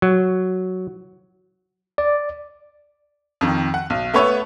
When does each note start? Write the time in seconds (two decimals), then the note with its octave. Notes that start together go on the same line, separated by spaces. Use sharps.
0.02 F#3
1.98 D5
3.41 F2 D#3
3.74 F#5
3.90 B1
4.14 A3 B3 B4 C#5 E5